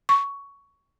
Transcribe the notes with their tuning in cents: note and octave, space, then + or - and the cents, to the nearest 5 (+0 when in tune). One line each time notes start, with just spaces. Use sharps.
C#6 +10